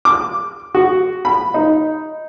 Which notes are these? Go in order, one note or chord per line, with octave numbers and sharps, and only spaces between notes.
D6
F#4
B5
D#4